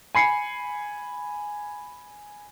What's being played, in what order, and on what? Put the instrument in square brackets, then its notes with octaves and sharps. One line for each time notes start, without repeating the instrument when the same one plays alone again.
[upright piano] G#5 B5 C7 C#7